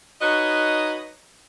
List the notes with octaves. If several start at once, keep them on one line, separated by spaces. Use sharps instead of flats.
D#4 F#4 B4 C#5 D#5